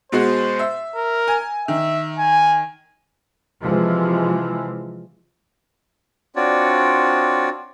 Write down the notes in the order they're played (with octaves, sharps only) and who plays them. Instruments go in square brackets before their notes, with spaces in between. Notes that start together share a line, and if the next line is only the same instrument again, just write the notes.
[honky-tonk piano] B2 G#3 F#4 [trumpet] C5
[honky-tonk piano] E5
[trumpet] A#4
[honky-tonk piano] G#5
[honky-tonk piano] D#3 [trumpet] E5
[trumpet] G#5
[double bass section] C3 E3 F3 G#3
[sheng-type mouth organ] C4 D4 F4 F#4 C#5 D5